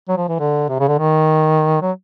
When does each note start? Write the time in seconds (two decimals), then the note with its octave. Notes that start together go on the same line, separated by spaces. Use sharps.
0.08 F#3
0.17 F3
0.28 E3
0.39 D3
0.69 C3
0.79 C#3
0.88 D3
0.98 D#3
1.82 F#3